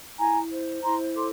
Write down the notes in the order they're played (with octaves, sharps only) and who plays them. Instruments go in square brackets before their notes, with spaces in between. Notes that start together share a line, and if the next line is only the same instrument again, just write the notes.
[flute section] E4 G#5 A#5
C5
E4 A#5 C6
A4 C6 D6